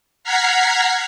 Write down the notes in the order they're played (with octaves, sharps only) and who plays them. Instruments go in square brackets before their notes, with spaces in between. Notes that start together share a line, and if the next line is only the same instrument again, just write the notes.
[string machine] F#5 A#5 F6 G#6 B6 C7